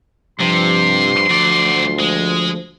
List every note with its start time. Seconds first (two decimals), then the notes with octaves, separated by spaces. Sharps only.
0.40 G2 C3 F3 C6
1.30 D2 F#3 D5
1.99 G#3